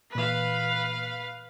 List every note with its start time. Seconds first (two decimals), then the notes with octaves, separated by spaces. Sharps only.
0.15 A#2 E3 B4 F5